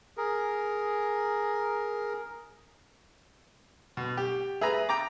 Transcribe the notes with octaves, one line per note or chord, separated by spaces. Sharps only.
G#4 A#4
B2
G4
G#4 B4 E5 A#5
G5 A#5 D6